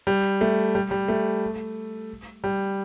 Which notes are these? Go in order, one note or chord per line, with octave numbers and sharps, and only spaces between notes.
G3
A3
G3
G3
A3
G3